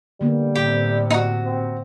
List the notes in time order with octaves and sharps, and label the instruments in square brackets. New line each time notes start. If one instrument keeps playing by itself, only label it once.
[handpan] D3 A#3 B3 [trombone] G3
[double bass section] A2 C3 [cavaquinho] G4
[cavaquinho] D#4 F#4
[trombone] C4